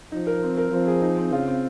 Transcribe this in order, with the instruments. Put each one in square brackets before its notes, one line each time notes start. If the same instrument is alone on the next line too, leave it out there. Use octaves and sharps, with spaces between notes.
[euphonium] F3 [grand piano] D#4
[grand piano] A#4
C4
A#4
[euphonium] F3 [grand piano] C4
[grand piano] G#4
D#4
C4
[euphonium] C#3 [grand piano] F4
[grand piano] C4